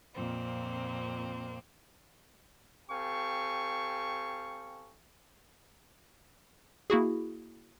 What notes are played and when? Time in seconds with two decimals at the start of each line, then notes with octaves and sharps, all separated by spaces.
0.14 F2 A#2 A#3 C4
2.90 C4 G4 A4 F5 G#5 C#6
6.90 A#3 E4 F#4 G#4